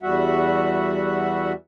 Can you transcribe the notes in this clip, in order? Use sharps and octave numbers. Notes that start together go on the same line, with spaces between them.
E2 G3 F#4 E5 F#5